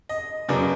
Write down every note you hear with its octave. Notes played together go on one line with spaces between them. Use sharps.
D#5
F#2 C#3 F#3 B3 D5